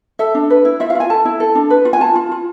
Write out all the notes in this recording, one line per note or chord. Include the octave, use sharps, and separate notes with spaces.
A4 E5
D4
B4
E4
F4 E5
F5
F4 G#5
A4 A5
E4
A4
D4
B4
F4
G#5
F4 A5
F4
F4